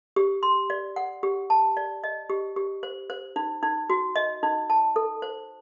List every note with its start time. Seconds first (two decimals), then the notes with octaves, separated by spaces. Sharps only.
0.16 G4
0.43 C6
0.70 D5
0.96 F#5
1.23 G4
1.50 A5
1.77 D5
2.04 D#5
2.30 G4
2.56 G4
2.83 C5
3.10 C5
3.36 D#4
3.63 D#4
3.90 F#4
4.16 D#5
4.43 D#4
4.70 A5
4.96 A4
5.22 C5